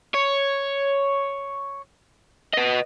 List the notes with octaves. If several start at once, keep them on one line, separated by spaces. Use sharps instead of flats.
C#5
B4 D#5